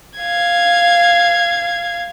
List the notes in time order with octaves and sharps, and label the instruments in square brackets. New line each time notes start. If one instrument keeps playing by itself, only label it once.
[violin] F5 G#6